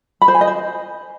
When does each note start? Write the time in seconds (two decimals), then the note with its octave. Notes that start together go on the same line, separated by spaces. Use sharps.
0.22 B5
0.28 C5
0.34 G#5
0.41 D#5
0.47 C5